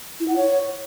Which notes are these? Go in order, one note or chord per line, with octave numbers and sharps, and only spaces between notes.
E4
F#5
C#5